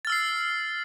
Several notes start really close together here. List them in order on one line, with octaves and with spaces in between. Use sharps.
A6 F6 E6 C7